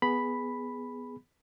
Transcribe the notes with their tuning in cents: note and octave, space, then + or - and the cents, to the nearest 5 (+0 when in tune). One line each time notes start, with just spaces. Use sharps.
B3 +0 G#4 +0 B5 +0